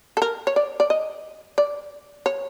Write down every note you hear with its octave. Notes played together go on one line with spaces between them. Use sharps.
A4
A#4
C#5
D5
D5
D#5
D5
C#5